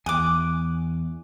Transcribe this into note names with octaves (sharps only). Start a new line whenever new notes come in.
E2 G#5 D6 D#6 F#6